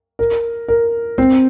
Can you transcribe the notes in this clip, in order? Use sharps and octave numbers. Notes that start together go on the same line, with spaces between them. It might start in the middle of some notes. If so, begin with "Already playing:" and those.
A#4
A#4
C4